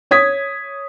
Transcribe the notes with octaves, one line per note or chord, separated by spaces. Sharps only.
C#5 D#6 G#6 B6